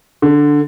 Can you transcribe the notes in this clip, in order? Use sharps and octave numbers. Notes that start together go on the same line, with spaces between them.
D3